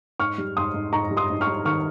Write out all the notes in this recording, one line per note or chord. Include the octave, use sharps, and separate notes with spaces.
G#2 C#6 F6
G3
G#2 C6 D#6
G#2
G#2 A#5 C#6
G3
C6 D#6
G#2
C#6 F6
G3
D#3 C#6 F6